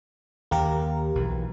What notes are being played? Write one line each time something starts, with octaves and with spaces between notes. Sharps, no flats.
D#2 A#3 G4 A#4
B1 E3